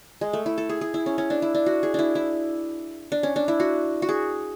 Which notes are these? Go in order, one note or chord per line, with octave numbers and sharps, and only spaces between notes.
G#3
A3
E4
A4
G#4
G#4
E4
C#4
C#4
D4
E4
D4
F#4
G#4
D4 E4
E4
D4
C#4
D4
E4
F#4
F#4
G#4